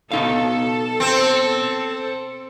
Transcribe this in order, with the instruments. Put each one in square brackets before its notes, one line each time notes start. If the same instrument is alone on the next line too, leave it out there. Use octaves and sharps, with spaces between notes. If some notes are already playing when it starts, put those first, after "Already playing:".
[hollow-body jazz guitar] B2 D#4 F5 [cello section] A4
[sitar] C4